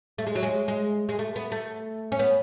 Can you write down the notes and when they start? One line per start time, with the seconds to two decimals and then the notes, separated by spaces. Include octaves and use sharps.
0.18 A3
0.27 G#3
0.35 F#3
0.43 G#3
0.68 G#3
1.09 G#3
1.19 A3
1.36 B3
1.52 A3
2.12 C#4
2.19 B3